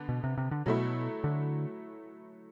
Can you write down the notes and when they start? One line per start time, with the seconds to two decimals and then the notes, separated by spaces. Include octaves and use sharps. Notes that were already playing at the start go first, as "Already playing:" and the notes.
Already playing: D3 B3
0.09 B2
0.24 C3
0.38 C3
0.51 D3
0.66 B2 F#3 A3 E4
1.24 D3